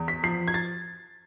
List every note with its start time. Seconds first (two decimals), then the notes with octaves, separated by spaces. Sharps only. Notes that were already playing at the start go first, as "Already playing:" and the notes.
Already playing: E2
0.08 B6
0.23 F3 C7
0.48 G#6
0.54 A6